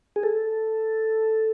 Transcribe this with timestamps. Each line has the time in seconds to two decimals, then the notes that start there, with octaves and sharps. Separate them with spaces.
0.16 G#4
0.23 A4